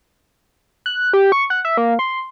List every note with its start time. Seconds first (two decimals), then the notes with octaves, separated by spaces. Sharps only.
0.86 F#6
1.13 G4
1.32 C#6
1.50 F#5
1.65 E5
1.77 A#3
1.99 C6